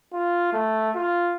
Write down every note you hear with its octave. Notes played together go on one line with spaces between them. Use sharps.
F4
A3
F4